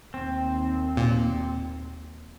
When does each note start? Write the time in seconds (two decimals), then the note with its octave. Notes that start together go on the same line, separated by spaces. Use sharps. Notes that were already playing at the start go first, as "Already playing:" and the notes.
0.14 D#2 C4
0.97 A#2